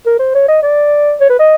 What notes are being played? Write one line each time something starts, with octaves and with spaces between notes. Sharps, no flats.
A#4
C5
C#5
D#5
D5
C#5
B4
D#5